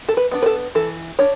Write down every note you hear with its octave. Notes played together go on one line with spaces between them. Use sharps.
A4
B4
B3 D4
B4
A4
E3 A4
D4 C#5